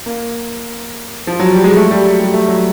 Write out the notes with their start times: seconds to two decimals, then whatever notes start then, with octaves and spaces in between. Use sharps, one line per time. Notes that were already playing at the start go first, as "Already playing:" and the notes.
0.06 A#3
1.27 F3
1.40 F#3
1.52 G3
1.64 G#3
1.77 A3
1.91 G3
2.05 F#3
2.20 G3
2.34 A3
2.48 F#3